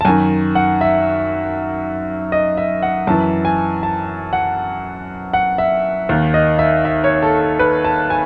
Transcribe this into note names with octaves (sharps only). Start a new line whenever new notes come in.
A5
F#2 D#3 G#5
F#5
E5
D#5
E5
F#5
F#2 E3 A5
G#5
A5
F#5
F#5
E5
D#2 D#3
D#5
E5
E5
C#5
A4
A4
B4
A5
G#5